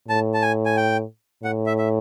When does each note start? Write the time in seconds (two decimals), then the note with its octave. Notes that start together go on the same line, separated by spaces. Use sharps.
0.08 A2 A5
0.34 A5
0.42 G#5
0.65 G#5
0.77 G5
1.43 A2 F#5
1.66 E5
1.78 E5